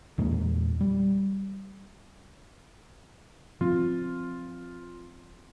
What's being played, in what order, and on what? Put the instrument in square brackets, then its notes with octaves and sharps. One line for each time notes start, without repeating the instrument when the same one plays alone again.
[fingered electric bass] E2 A#2 G#3 A#3
G3
[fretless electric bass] F3 C4 [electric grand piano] F4